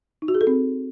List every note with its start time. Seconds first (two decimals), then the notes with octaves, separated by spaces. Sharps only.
0.22 D#4
0.28 F#4
0.35 G#4
0.41 A4
0.47 C4